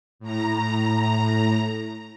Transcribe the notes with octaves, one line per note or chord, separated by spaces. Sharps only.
A2 A#5